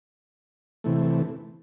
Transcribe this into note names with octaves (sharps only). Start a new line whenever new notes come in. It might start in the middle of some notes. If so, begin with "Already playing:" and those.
C3 E3 A3